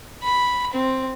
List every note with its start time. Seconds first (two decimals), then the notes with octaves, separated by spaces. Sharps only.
0.23 B5
0.73 C4